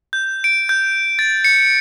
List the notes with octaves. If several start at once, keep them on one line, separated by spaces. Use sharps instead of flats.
G6
D7
G6
A6
C#7